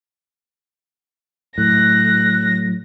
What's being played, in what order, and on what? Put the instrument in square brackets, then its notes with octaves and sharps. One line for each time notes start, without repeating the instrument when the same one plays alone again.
[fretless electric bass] A2 [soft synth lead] F#3 [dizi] F#6 [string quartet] A#6